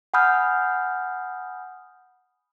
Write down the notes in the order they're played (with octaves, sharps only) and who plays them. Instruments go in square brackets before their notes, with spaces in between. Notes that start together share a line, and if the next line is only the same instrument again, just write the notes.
[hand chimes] F#5 G#5 B5 D#6 F6 G6